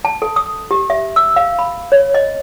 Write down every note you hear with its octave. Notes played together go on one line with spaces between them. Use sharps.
A5
A4
D#6
G4
E5
E6
F5
B5
C#5
D#5